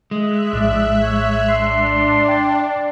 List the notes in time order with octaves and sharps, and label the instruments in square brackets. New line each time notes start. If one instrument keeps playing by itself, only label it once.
[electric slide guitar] G#3 [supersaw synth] E5 F#6
[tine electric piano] A#1 A2 [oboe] D4
[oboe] C#5
[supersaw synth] D4 [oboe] C6
[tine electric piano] G5 A6